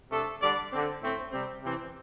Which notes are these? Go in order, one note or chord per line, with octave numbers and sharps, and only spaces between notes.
C3 A3 D4 A4
D3 G3 D4 D5
D3 C4
A2 A3 C4
C3 G3 C4
C3 E3 C4